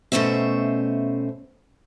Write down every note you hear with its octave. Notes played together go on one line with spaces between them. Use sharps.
B2 A3 C4 C#4 C5 E5